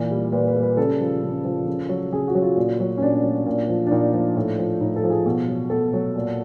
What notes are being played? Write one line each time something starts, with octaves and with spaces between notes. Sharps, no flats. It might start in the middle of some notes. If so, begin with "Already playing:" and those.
Already playing: A#2 E3
G3
A#2 B4
B4
G3
B4
C#3 A4
F3
C#3
F3
C#3
F#3
C#3 G#4
F#4
F#3
F4
A#2
F#3
C#4
A#2 D4
F#3
A#2
F3
D4
A#2 D#4
F3
A2
F3
A2 D#4
A4
F3
G#4
B2
F#3
B2 A4
F#3
A#2